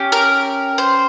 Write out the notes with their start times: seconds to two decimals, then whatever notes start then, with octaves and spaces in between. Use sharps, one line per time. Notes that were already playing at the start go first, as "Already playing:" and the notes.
Already playing: C#4 G4
0.12 A#4
0.78 C5